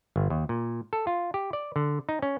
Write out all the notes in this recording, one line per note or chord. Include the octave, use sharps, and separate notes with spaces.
G1
D#2
A#2
A4
F4
G4
D5
D3
D#4
C#4